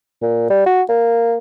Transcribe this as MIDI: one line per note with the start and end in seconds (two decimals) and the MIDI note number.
0.22 0.47 46
0.50 0.66 55
0.66 0.82 66
0.89 1.37 58